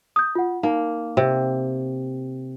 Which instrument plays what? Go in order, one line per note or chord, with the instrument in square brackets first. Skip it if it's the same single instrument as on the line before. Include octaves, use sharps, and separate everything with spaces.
[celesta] D#6 G6
F4 F#5
[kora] A#3 [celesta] D#4
[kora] C3